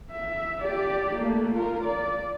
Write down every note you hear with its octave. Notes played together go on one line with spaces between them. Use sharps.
E5
G4 D5
A3 A#3
F4 A#4
D5